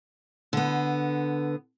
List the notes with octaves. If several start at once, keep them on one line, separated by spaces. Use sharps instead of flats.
D3 B3